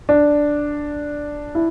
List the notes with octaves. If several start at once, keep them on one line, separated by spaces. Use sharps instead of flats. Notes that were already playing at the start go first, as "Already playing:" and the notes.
D4
E4